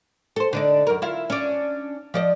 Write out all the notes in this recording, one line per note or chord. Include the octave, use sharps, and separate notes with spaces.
A4 C5
D3 D4 D#4
F#2 A#4
E4 F4 F5
C#4 D4
F3 D5 D#5